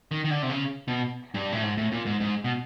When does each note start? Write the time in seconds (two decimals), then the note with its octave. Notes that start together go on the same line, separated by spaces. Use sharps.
0.11 D#3
0.25 D#3
0.30 D3
0.42 C3
0.50 C#3
0.88 B2
1.34 G2
1.52 A2
1.63 G#2
1.77 A2
1.92 A#2
2.06 G#2
2.20 G#2
2.44 B2